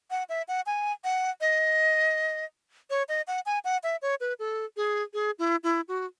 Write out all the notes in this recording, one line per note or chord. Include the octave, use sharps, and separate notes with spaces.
F#5
E5
F#5
G#5
F#5
D#5
C#5
D#5
F#5
G#5
F#5
E5
C#5
B4
A4
G#4
G#4
E4
E4
F#4